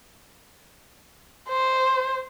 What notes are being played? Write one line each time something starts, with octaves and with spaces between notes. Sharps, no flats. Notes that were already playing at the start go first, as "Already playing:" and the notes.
C5